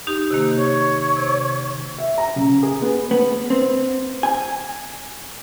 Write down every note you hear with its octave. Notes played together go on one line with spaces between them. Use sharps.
D#4 G4
C3 D#3 A#3
C#5
C3
E5
A#5
C#3
G#4
B3
B3
C4
G#5